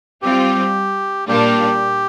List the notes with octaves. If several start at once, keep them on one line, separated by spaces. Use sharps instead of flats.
G3 C4 F4 G4
A#2 G3 A#3 D4 F4 G4